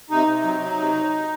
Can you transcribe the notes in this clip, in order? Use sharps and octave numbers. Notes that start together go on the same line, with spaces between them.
C3 D#4
C3
F#3
F#3
C3